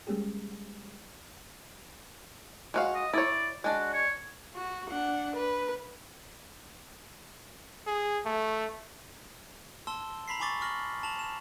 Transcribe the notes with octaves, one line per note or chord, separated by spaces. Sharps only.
G3 G#3 A#3 C#4 G4 G#4
G#3 F#4 F5
D#5
E4 C#5 D5
G#3 D4 F#4
C#5
F#4
D4 F#5
B4
G#4
A3
A5 C6 E6 G7
A#5 B5 B6 C7
G#5 B5 C#6 D6 A6 G7
C#6 F6 A#6 F#7
A5 F7 F#7
E7